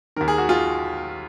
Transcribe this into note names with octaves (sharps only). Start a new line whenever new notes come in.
D#2 D#3 A#4
G#4
F#4
F4 G#4